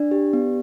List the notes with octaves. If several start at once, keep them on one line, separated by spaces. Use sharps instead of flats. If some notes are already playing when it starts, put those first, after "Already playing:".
Already playing: D4 D5
G4
B3